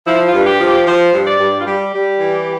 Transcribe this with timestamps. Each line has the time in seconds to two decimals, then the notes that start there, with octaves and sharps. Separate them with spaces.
0.06 F3 E4
0.27 F4
0.33 G2
0.47 G4
0.60 F3
0.67 G4
0.87 F3 C5
1.13 G2
1.26 D5
1.40 G2
1.60 F4
1.66 G3 G4
1.94 G3
2.19 E3